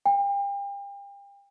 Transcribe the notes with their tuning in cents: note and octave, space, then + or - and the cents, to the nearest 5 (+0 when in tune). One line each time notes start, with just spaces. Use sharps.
G5 +35